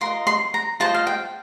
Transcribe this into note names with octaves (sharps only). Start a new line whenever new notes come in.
F4 A#4 D#5 C6
C6
A#5
F4 C5 D#5 A5
F5
G5